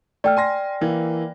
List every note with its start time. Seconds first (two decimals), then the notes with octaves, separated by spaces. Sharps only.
0.24 A3 D5 G5 F6
0.37 G#5 C6 A#6
0.81 E3 A#3